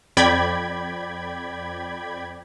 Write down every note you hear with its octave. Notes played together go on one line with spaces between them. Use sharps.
F2 D5 G5 B5 G#6